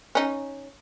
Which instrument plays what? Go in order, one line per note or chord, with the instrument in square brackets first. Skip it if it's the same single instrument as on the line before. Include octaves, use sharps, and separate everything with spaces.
[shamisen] C#4 D#4